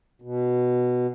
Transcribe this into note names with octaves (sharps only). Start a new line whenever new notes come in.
B2